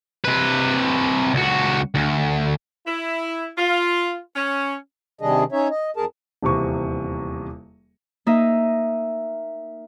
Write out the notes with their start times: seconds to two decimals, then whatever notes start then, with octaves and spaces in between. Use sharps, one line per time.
0.24 C3 B4
1.34 C#2 F#4
1.94 D2
2.86 E4
3.58 F4
4.36 C#4
5.21 C3 D#3 G3 D4 G#4 D#5
5.52 C#4 D#4 C#5 E5
5.70 D#5
5.96 F2 G#4 A#4 A5
6.43 D#1 E2 C3 C#6
8.26 A#3 D#4 D#5 E5